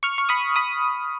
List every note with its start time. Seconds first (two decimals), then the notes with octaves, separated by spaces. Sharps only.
0.03 C#6 F6
0.18 C#6
0.29 B5 D#6
0.56 B5 D#6